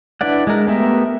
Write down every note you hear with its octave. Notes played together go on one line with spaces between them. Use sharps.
D4 E4 B4 D5 F#5
G#3 A#4
A3 B3 G4 A#4 E5